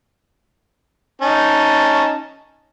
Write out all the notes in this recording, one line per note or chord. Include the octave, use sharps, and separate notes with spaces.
C#4 D#4 A5